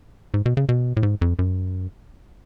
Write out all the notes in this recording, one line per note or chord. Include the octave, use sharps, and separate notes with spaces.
G#2
B2
C#3
B2
A2
G#2
F2
F#2